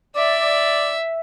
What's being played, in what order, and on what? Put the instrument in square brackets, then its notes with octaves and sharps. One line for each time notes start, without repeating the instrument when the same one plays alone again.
[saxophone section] D5 [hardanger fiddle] E5